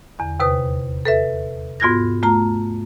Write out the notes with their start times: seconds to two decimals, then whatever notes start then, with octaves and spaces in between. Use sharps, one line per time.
0.19 E2 D3
0.40 D#2 C3 B4 D#6
1.05 A4 B4 E5
1.80 G#2 B3 F4 F#4 G#6 A#6
2.23 A3 F4 A#5